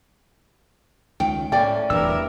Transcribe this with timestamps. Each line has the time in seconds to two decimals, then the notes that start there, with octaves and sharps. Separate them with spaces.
1.20 C#2 D#3 G5
1.52 A2 A3 A#3 C#4 D5 G5
1.90 D1 E2 G2 E4 A#4 E6